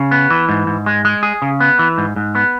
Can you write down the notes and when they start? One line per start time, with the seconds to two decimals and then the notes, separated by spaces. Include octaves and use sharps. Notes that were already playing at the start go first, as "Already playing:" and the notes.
Already playing: C#3
0.11 B3
0.30 E3
0.49 G#2
0.67 G#2
0.86 G#3
1.05 G#3
1.23 G#4
1.42 C#3
1.60 B3
1.79 E3
1.98 G#2
2.16 G#2
2.35 B3